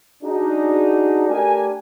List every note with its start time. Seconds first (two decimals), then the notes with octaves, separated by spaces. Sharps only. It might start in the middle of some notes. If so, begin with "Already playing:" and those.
0.23 D4 D#4 F#4 G#4
1.28 A3 D4 G4 A#4 G5 G#5